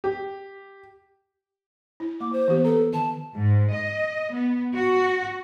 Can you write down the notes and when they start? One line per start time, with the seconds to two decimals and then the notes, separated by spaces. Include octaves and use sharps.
0.04 G4
2.00 E4
2.20 A#3 D6
2.33 C5
2.48 E3 B3 G4
2.64 A4 B4 A#5
2.93 D#3 A5
3.36 G#2
3.74 D#5
4.34 B3
4.75 F#4